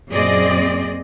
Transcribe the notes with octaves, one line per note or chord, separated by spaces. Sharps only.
F#2 A#2 C4 G#4 D5 D#5